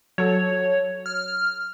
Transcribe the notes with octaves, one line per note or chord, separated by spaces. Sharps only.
F#3 A4 C#5
F6